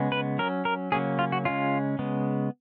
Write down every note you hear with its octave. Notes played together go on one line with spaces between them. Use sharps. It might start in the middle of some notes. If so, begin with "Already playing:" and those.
Already playing: C#3 G#3 B3
B4
F#3 C#4 A#4
A#4
C#3 F#3 A#3 C#4 G#4
F4
F#4
C#3 G#3 C#4 F4
C#3 G#3 B3